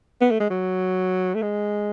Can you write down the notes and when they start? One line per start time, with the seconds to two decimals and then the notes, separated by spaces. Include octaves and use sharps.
0.21 B3
0.31 A3
0.40 G#3
0.50 F#3
1.35 A3
1.42 G#3